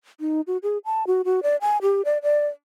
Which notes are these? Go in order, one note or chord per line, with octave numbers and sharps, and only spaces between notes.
D#4
F#4
G#4
A5
F#4
F#4
D5
G#5
G4
D5
D5